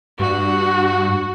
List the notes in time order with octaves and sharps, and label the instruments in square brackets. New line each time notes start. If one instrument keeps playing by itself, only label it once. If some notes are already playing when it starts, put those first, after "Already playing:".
[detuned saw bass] G2 [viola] F#4